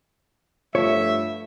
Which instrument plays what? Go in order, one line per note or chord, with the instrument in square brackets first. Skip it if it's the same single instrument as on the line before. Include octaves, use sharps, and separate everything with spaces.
[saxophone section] G2 A3 [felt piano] F3 [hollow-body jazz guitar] C#5 [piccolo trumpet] E5